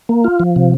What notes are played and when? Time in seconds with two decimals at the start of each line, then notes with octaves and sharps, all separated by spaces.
0.09 A#3
0.24 F4
0.40 F3
0.56 C3